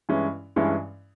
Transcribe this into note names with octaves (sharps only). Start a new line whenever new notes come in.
G2 E3 G#3 C#4 E4
G2 E3 G#3 C#4 E4